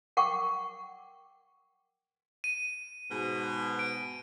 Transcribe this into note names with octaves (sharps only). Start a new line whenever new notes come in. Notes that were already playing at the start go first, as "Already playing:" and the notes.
A#4 F#5 G5 C#6 D6
D#7
G#2 B2
D7